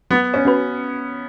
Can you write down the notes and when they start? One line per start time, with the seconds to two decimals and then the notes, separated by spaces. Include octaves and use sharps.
0.11 F#3 B3
0.34 C#4
0.45 C#4 F#4 B4